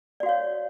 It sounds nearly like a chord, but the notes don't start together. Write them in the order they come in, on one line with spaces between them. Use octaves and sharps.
D5 F#4 F5 C#5